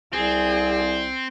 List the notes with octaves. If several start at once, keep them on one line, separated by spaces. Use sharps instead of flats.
C2 C4 G#4